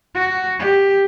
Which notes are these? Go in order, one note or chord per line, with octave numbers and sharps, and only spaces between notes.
F#4
G4